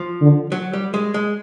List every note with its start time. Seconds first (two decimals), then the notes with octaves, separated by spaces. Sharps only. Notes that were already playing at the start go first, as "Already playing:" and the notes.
Already playing: F3
0.21 D3
0.52 F#3
0.73 G3
0.94 G#3
1.14 G#3